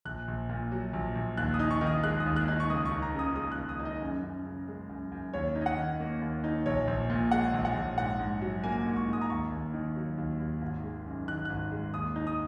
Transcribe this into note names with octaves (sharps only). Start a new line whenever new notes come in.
A#1 F#6
A#1
A#2
F#3
A#1
A#1
D#2 F#6
D#6
D#4
C#6
D#3
D#6
G#3 F#6
D#6
D#2
F#6
D#4
C#6
C#2 D#6
C#6
D#4
A#5
C#3
D#6
G#3 D#6
F#6
C#2
D#6
D#4
D#5
F#2
F#2
C#3
G#3
F#2
F#2
D#2 C#5
D#4
D#5
F#5
D#3
A#3
D#2
D#4
A#1 C#5
A#1
A#2
G#3 F#5
A#1
F#5
A#1
G#2 F#5
G#2
F#3
A#3 G#5
G#2
C#6
G#2 D#6
A#5
D#2 C#6
D#2
D#3
F#3
D#2
D#2
G#1
G#3
F#2
D#3 F#6
G#1 F#6
G#3
D#2 D#6
D#4
D#6